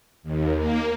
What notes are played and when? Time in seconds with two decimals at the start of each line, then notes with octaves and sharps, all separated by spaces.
0.23 D#2
0.57 A#3